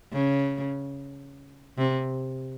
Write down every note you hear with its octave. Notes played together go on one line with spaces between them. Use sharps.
C#3
C3